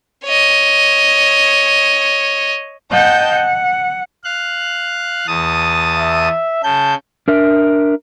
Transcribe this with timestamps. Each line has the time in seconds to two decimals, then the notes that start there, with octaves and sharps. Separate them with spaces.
0.25 C#5 D#5
2.91 D#5 F#5 G5 A5 G6
3.32 F#5
4.24 F5 F#6
5.27 E2 A5 D#6
5.98 E5
6.63 C#3 A5 G6
7.28 D4 A#4 E5